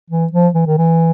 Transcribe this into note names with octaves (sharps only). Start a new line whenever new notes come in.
E3
F3
E3
D#3
E3